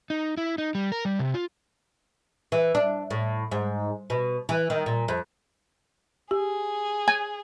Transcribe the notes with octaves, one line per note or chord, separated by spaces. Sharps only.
D#4
E4
D#4
G3
A#4
G3
C3
F4
E3
D4
A2
G#2
B2
E3
D#3
A#2
F2
G4 G#4
G#5